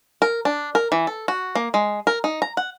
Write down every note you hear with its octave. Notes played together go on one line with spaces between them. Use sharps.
A#4
D4
A#4
E3
A4
F#4
A#3
G#3
A#4
D#4
A#5
F#5